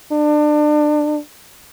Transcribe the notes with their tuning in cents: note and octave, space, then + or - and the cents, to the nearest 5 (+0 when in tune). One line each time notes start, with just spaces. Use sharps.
D4 +30